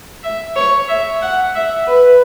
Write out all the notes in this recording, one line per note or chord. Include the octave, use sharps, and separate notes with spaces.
E5
C#5
E5
F#5
E5
B4